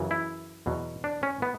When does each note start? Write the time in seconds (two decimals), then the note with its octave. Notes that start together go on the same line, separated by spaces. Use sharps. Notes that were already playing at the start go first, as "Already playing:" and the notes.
Already playing: F#2 C#3 E3
0.11 E4
0.66 E2 B2 F#3
1.04 D4
1.23 C#4
1.42 B3